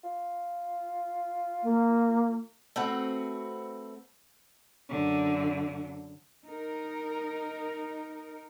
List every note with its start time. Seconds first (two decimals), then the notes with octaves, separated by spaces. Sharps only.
0.04 F4
1.63 A#3
2.76 A3 C4 F#4 B4
4.90 F#2 D3
6.45 D#4 A#4